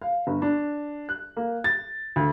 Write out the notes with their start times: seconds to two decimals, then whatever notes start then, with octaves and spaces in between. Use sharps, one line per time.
0.02 F5
0.27 G1
0.42 D4
1.09 F#6
1.37 A#3
1.64 A6
2.16 D2